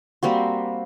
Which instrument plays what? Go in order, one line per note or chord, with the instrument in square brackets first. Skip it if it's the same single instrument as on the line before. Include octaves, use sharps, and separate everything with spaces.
[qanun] G3 A#3 C4 F#4